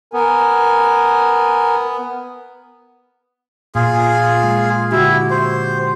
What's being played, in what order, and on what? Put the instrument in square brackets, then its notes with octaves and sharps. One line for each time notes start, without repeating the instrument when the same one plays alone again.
[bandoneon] B3 [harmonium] A#4 G#5
[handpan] A#2 [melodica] F4 G#4
[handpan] G#3
[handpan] D3 F#4 G4 [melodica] E4
[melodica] C5